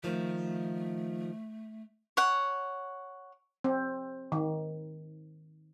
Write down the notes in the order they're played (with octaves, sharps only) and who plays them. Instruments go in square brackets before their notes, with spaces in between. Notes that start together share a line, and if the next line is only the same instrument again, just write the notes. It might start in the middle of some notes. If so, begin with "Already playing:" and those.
[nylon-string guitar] D#3 F3 [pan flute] A3
[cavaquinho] C#5 F#5
[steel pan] C4
D#3